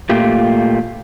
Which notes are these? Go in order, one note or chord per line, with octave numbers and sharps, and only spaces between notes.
A#2 A3 A#3 F4 G4